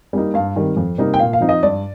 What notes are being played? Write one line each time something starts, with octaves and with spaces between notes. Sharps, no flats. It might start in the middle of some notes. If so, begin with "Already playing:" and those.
G3 A#3 D#4
G2 F5
D#3 G3 C4
F2
C3 G3 A#3 D#4
G5
A#2 F5
F5
F3 C4 D#4
D#5
G2 D5